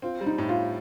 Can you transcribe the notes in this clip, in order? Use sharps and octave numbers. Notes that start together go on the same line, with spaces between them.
C4 F4
G3
D#4
A2
F4